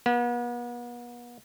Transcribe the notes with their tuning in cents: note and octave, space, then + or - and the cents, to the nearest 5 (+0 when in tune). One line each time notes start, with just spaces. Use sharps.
B3 -40